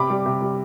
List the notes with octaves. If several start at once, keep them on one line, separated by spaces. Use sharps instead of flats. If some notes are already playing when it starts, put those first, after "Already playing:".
Already playing: C3 B5 D6
G3
C3
G3